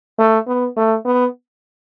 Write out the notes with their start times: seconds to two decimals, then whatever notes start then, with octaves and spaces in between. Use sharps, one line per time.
0.18 A3
0.47 B3
0.76 A3
1.05 B3